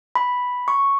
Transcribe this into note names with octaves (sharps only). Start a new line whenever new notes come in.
B5
C#6